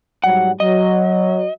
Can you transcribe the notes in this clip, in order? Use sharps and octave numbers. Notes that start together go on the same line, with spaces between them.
G#2 F#3 G3 F#5
F#3 D#5